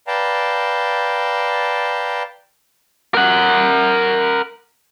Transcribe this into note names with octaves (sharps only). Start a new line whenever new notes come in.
B4 D5 F5 G5 A5 A#5
A#4 F#5